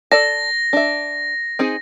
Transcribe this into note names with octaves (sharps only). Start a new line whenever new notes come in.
A4 D5 A5 A#6
D4 E5
C4 D#4 G#4